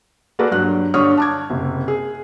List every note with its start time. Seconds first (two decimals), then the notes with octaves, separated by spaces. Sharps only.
0.39 A#3 F#4 G#4 A4 B4 D5
0.51 G2 F#3 F#6
0.94 G2 D3 C#5 C#6 D#6 F6
1.17 A5 D6 G#6
1.50 F#1 C3
1.88 G#4